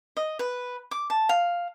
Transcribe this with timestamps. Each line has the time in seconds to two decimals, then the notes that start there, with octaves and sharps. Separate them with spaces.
0.17 D#5
0.39 B4
0.91 D6
1.10 A5
1.29 F5